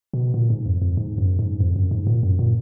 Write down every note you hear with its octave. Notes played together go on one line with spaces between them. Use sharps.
B2
A#2
G#2
F2
F2
G#2
F#2
G#2
F2
F#2
G#2
A#2
F#2
A#2